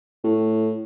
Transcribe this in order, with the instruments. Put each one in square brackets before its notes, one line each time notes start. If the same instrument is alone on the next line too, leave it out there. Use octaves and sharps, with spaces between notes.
[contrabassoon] A2